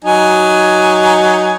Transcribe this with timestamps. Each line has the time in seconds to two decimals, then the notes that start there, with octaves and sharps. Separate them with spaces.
0.05 F#3 D#4 G#5